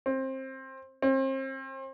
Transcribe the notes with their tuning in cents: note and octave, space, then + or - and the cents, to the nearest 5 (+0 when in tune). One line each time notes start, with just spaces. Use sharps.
C4 +20
C4 +35